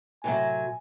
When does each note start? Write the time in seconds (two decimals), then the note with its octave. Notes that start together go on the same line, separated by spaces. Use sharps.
0.24 A2 C3 F#3 G#5